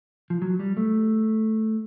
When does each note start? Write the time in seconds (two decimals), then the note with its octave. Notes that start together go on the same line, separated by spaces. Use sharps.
0.30 F3
0.42 F#3
0.60 G3
0.77 A3